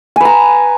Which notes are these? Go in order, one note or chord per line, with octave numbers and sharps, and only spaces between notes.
B4 G#5 A#5